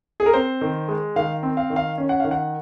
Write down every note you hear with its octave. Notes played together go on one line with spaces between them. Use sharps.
G#4
A#4
C4 C5
D#3
G#3
D#3 F5
C4
F5
D#3
F5
C#4
F#5
D#3 F5
F#5